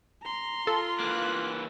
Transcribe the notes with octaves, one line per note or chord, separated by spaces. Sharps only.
A#5 C6
F4 A4
E3 A#3 F#6